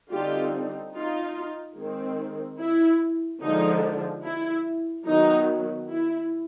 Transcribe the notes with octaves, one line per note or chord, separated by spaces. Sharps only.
D3 G3 C4 D#4 F4 G4
D#4 F4
D#3 G#3 C4
E4
D3 F3 G#3 D#4
E4
D#3 F#3 B3 D#4
E4